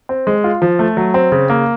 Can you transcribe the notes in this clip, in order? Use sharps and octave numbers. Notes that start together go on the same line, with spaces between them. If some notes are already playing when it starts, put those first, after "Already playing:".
C4
G#3
F4
F3
A3
F#3
C4
C#3
A#3